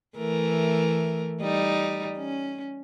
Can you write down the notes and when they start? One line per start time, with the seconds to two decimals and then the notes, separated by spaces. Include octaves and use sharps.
0.17 E3 A3 A#4
1.42 G3 D#4
2.17 C#4